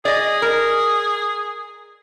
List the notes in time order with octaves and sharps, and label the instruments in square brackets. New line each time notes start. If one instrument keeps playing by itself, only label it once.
[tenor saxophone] G#4 [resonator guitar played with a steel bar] D5 D#5
[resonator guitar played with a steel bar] A#4